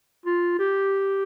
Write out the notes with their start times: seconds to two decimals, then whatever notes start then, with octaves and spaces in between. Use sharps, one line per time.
0.26 F4
0.59 G4